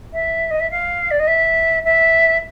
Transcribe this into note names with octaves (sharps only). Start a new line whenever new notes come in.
E5
D#5
E5
F5
D5
D#5
E5
E5